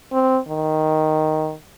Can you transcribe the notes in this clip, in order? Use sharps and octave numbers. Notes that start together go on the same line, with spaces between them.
C4
D#3